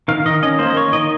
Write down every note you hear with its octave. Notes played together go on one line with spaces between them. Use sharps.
D#3 F5
D#3 D#5
C#4 D#5
A#3 C5
D#5
A#3 C#5
D#3 D#5